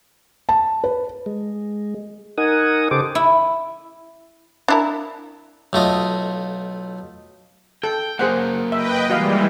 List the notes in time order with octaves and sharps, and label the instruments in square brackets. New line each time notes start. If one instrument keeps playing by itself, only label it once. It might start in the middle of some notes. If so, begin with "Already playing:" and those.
[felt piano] A5
B4
[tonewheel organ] G#3
D#4 A#4 F#5 G#5 D#6
C#3 G4 A4 C5 D6
[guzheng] E4
[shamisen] D4 E4 A#4
[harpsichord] B1 A3 F4 D#5
[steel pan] A4 [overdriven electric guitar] G5
[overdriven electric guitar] F#3 A#3 [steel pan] G#4 C5 F#5
[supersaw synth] B4 D#5 G5 [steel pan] E5
[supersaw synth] E3 G3 G#3 [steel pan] F#4 D#5 F5